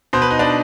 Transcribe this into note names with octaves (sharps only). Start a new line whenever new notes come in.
B2 C5
B4
D#4
D4